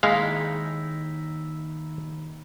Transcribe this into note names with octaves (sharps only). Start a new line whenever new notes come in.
D#2 G#3 D#4 E4 F5